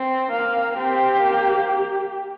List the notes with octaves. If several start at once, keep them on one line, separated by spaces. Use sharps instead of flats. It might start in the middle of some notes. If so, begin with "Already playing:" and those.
Already playing: C4
A#3 F5
C4 G4
A#3